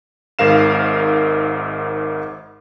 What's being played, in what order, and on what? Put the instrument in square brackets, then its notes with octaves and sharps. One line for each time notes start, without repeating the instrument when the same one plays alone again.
[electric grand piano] G#1 G#2 A#4 F5 E7